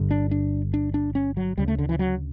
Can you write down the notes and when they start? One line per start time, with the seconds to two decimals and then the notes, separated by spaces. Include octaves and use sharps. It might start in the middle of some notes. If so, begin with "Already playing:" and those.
Already playing: G1 G2 D3
0.11 D4
0.31 D4
0.74 D4
0.94 D4
1.15 C#4
1.37 F#3
1.58 D2 C#3 G3
1.68 A3
1.79 D3
1.89 E3
1.99 F#3